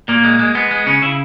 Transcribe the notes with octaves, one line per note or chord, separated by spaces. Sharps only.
A#2 A#3
G#3
G#3
G#3 B3
G#3
C#3 C#4
C#3 E4